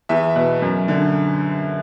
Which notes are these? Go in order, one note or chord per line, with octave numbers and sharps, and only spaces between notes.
E2 E5
B2
F#2
D3